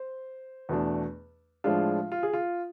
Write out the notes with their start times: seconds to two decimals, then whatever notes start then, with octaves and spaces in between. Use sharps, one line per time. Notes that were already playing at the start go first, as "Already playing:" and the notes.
Already playing: C5
0.69 E2 B2 A3 D4
1.64 A2 F3 G#3 D4 F4
2.12 F4
2.23 G#4
2.33 F4